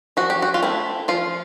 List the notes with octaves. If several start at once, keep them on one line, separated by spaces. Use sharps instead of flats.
F3 F#4
G4
F#4
F4
A3 C4 E4
F3 F4